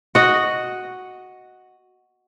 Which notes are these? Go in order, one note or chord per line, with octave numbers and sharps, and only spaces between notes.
F#4 D#5